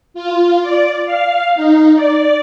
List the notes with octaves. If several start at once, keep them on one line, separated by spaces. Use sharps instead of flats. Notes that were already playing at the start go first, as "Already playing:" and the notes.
F4
D5
F5
D#4
D5